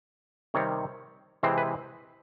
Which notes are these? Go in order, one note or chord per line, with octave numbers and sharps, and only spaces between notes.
C3 D#3 G3 C4 C#5
C3 E3 G#3 C4 C5
B4